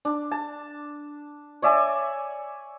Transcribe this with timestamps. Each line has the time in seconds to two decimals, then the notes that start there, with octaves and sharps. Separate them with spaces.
0.05 D4
0.31 A5
1.62 C#5 D5 E5 G#5